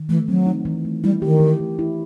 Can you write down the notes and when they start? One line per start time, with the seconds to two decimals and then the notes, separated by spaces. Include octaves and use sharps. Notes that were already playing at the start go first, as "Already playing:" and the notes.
Already playing: D#3
0.09 E3 A3
0.28 F#3 C4
0.46 D#4
0.65 E3
0.85 A3
1.04 G3 E4
1.22 D#3 G4
1.40 E3
1.60 A3
1.79 E4